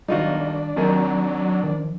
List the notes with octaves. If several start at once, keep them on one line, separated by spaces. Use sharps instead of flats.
B1 D#3 G3 D4 D#4 F4 F#4
D#2 D#3 F#3 C4
D#3 F3